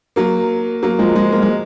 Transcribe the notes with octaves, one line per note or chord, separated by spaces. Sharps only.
F#3 A#3
F#3 A#3
F3 G#3
F3 G#3
A#3
G#3